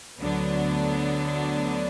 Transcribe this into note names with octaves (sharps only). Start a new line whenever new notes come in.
D2 D3 F#3 B3 D4